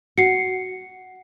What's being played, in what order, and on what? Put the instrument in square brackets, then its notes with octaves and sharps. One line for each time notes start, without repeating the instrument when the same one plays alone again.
[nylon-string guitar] F#4 [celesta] C7 C#7